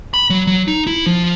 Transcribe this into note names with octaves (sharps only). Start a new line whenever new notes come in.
B5
F#3
F#3
D#4
E4
F3